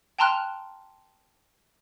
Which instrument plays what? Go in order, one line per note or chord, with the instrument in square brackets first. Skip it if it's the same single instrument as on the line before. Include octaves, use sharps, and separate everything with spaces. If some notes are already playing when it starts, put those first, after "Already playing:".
[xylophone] G5 A5 A#5 C6 F6 F#6